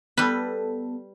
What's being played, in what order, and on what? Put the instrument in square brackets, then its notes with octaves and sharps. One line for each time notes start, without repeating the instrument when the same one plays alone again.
[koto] G3 B4 [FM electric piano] B3 A4